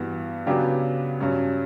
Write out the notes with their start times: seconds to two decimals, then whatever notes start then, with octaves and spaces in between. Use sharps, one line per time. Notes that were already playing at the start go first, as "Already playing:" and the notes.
Already playing: G2 E3 B3 F#4
0.46 C#3 F#3 B3 D4 G4
1.20 G2 F#3 C#4